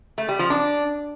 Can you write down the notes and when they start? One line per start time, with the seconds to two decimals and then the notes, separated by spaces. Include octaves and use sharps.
0.18 A3
0.29 G3
0.39 F3
0.50 D4